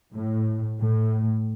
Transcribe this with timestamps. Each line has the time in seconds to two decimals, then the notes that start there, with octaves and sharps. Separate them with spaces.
0.12 A2
0.79 A2